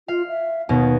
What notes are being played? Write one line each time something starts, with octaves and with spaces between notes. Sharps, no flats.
F4 F5
E5
D#2 B2 D#3 B3